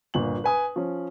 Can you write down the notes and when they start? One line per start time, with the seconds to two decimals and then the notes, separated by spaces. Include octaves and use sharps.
0.14 G1 A#2 F#7
0.44 B4 G#5 D#6
0.76 F3 C#4